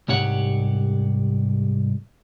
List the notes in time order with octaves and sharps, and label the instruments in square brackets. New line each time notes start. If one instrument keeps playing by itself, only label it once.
[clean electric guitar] C2 G#2 G4 C#5 F#5